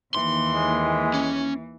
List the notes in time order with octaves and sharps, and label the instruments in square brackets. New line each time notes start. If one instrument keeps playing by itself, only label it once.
[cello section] D#2 [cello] E3 [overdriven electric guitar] C6
[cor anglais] G#3
[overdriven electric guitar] C#4